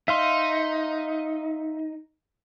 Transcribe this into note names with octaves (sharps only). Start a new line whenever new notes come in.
D#4 E5 F5 C6